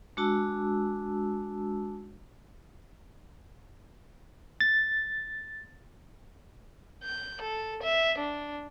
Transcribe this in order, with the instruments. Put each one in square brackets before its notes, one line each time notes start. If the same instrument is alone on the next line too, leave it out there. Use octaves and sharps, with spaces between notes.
[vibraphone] G#3 D4 F#4 A5 E6
[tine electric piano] A6
[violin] G6
A4
E5
D4